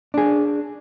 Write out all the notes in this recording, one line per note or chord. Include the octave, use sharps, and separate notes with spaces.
D4 G#4